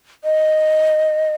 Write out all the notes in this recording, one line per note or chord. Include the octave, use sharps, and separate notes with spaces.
D#5